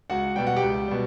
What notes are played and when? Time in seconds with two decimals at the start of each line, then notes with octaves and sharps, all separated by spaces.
0.10 C#2 F#4 F#5
0.36 B2 G3 G5
0.47 F#5
0.56 G4 G5
0.63 C#2
0.88 B2 G3